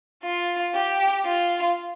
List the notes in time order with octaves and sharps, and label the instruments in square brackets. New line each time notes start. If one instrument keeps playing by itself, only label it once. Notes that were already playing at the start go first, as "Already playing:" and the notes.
[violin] F4
G4
F4